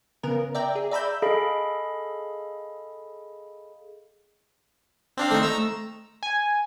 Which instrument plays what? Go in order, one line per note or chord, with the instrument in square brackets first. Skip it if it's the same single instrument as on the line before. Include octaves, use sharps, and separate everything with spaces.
[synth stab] C#3 B3 A#4
D5 E5 G5 A#5
G#4
D5 E5 A#5 B5 E6 G6
[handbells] G#4 A4 D#5 F5 B5
[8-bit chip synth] C4 D4 F5
[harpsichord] A3 [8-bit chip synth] C4 D#4
[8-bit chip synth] A#5 E6
[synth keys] G#5